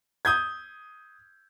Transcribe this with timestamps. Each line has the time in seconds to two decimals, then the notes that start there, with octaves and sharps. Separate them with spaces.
0.25 D#6 G6 G#6